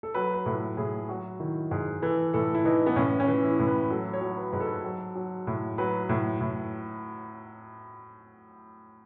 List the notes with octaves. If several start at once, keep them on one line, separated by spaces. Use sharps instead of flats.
A4
F#3 B4
B4
A2 A4
A2 G#4
F#3 F#4
D#3 E4
G#2 G#4
E3 A4
A2 A4
E4
E3 D#4
B3
A2 C#4
C#4
E3
E4
A2
B4
F#3 A4
C#5
F#3
B4
G#2 B4
A4
F#3
F#3
A2
F#3 B4
A2
A2